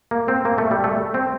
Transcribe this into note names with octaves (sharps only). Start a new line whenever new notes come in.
A#3
C4
A#3
A3
G3
A3
C4